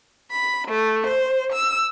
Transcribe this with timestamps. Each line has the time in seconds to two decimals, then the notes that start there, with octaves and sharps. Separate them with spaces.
0.31 B5
0.67 A3
1.06 C5
1.53 E6